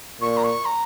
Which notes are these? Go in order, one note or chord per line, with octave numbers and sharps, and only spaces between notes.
A#2 C#6
A#5
C#6
A#5